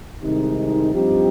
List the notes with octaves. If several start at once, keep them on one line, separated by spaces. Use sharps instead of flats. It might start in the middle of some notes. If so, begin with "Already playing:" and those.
C2 C3 D#3 G#3 D#4
G2 F3 C4 D#4 G4